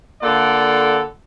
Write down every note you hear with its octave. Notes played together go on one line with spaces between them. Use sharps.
D3 A#3 F4 A4 D5 F#5